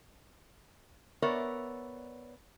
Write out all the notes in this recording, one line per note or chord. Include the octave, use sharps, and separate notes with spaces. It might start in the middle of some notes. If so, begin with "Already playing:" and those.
B3 A#4 C#5 D5 E5